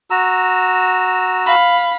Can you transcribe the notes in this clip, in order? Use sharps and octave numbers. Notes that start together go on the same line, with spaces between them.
F#4 A#5 E6
F5 B5